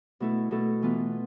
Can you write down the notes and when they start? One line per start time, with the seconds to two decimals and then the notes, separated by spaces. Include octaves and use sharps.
0.20 B2 A3 E4 A4
0.51 B2 A3 E4 A4
0.82 E3 B3 F4